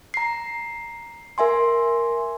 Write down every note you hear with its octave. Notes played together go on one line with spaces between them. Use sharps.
A#5 C7
A#4 E5 G#5 C6